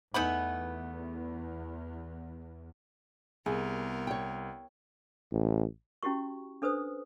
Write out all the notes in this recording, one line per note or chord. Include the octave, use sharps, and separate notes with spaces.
E2 A3 B3 D#4 F#5 G#5 B5
C2 B3 G#4 A#4 G#5
C#5 G5
A1
C#4 E4 F#4 G4 C#6
D4 A4 B4 C5 D#6